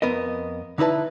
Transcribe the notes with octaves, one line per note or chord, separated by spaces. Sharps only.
F2 B3 A#4 D#5
D3 D#4 E4 B4 A5